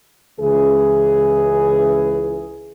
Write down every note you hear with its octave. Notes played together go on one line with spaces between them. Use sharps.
C#2 E3 G#4